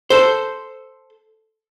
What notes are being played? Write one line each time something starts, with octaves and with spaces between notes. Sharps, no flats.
A4 C5